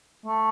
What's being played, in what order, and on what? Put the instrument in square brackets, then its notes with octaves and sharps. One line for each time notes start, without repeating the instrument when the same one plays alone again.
[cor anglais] A3